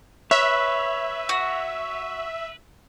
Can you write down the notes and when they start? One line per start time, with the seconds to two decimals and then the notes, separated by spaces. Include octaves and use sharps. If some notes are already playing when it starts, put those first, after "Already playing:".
0.31 B4 C#5 E5
1.29 F#4